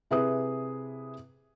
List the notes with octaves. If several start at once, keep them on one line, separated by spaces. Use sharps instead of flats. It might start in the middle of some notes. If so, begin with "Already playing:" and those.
C3 E4 G#4 B4 D#6